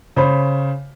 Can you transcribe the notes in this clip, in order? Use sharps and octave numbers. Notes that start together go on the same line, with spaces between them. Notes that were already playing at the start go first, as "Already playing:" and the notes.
C#3 C5 C#5 B5